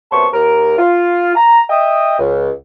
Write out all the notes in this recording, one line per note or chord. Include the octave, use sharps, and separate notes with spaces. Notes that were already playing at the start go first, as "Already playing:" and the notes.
F#2 C3 B3 A5 C6 C#6
D#2 A#4
F4
A#5
D#5 E5 G5 D#6
C#2